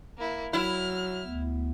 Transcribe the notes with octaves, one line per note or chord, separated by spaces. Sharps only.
A#3 E4
F#3 E4 F6
D2 B3